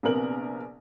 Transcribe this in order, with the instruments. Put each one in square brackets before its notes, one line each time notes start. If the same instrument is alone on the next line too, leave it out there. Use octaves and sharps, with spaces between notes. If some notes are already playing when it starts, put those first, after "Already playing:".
[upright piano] A#1 C3 B3 A#4 F#7